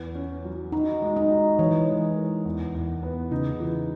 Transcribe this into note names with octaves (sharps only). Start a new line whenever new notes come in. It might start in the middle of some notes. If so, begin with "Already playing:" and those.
Already playing: E2 B4
C#4
F#3
D#4 F#4
G#3
D#4
F#4
E3 C#5
G#3
A#4
E2
E2
B3
C#3 D#4
E3